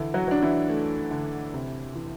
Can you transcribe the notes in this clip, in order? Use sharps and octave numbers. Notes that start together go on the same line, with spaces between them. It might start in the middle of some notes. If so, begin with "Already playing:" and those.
Already playing: D3 E3 E4
F#3 F#4
F#3 D4
E3 E4
A3
D3
C3
E3